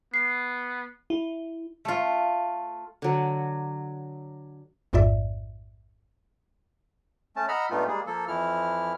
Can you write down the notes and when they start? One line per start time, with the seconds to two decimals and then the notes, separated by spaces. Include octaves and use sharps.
0.14 B3 C7
1.10 E4
1.85 A3 F4
3.02 D3 F#3
4.93 A1 F2 G#2 F4 D5 E5
7.36 A3 C#4 A5
7.48 D#5 F#5 A#5 B5 E6 F6
7.70 G2 A#2 A3 B3 D#4 F4
7.87 G3 G#3 A#3 G#4
8.07 F3 A#3 A4
8.28 F2 E3 F3 E4 F6